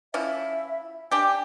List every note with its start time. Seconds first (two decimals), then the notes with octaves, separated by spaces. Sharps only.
0.14 F3 C#4 E4 E5
1.11 D4 G4 G#5